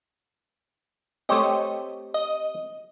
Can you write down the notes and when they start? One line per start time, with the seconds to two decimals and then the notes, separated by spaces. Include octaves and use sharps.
1.29 A3 C4 G4 C#5 D#5
2.14 D#5